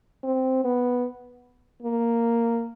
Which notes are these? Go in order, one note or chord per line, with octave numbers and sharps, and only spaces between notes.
C4
B3
A#3